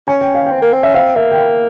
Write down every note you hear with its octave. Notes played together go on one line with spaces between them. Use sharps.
C#4 G#5
G5
F5
G5
C4
A#3
C4
C#4 E5
C4 F5
A#3 E5
G5
F5